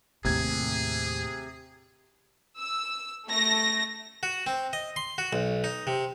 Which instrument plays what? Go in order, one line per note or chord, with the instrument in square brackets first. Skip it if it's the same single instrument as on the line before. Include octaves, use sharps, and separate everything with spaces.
[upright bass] D#2 A2 [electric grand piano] C3 G#6 [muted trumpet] G#4
[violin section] E6
A3 A#6
[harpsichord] F#4
C4
D#5
C6
F#4
B1
D#4
C3